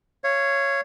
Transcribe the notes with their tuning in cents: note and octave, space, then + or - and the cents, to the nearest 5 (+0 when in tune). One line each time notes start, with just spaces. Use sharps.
C#5 +0 F5 -30